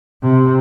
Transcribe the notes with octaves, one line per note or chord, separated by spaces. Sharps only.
C3